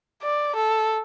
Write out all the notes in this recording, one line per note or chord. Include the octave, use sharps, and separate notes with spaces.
D5
A4